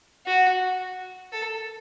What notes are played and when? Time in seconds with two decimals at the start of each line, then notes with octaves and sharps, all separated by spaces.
0.26 F#4
1.32 A4